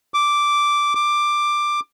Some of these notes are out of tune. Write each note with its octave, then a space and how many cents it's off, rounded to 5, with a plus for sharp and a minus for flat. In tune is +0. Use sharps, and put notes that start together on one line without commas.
D6 -5
D6 +10